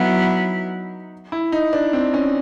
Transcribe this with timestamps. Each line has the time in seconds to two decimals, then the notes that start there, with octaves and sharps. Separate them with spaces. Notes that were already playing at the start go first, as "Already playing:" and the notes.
Already playing: F#3 B3 D#4 E4
1.32 E4
1.52 D#4
1.73 D4
1.93 C4
2.14 C#4